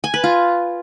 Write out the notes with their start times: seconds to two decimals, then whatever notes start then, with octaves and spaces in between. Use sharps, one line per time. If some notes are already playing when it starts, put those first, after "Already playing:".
0.04 G#5
0.14 B4
0.24 F4